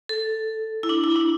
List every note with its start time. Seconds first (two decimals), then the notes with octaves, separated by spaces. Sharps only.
0.09 A4
0.83 E4
0.89 D4
1.04 E4
1.16 D4